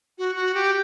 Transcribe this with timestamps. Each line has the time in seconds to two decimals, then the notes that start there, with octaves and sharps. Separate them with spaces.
0.18 F#4
0.36 F#4
0.54 G4